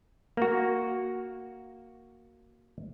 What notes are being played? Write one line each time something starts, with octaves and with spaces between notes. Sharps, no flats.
A#3 F#4